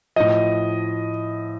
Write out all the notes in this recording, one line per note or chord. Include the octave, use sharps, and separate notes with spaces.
A2 F3 D#5